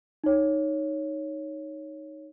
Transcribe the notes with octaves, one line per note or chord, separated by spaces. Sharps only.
D#4 C#5